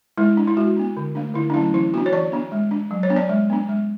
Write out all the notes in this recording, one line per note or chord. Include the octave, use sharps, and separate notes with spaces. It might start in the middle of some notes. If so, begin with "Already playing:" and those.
G#3 E4
D4
E4
G#3 F#4
B3 D4
D3
A3 D4
D3 E4
D4
F#3 A3 C#4 E4
E3 E4
B3 D4 F#4
C#5
E3 D5
B3 D4
G#3
D4
F#3
C#5
B3 D4
D5
G#3
B3 D4
G#3